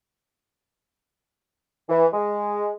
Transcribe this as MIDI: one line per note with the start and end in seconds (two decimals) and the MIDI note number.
1.89 2.06 52
2.13 2.75 56